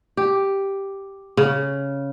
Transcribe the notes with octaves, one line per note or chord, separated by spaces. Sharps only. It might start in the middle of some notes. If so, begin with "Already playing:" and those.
G4
C#3